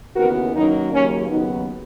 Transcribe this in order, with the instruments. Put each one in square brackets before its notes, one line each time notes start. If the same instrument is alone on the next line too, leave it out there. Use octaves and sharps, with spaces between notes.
[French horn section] D#2 C#3 E3 B3 F#4 A#4
F#2 D#3 F#3 A#3 D#4
D#2 C#3 F#3 A#3 C#4
D#2 C#3 F#3 B3 D#4